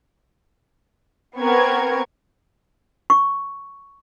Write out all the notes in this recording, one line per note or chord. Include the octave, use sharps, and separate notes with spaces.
B3 C4 A#4 C#6 G#6
C#6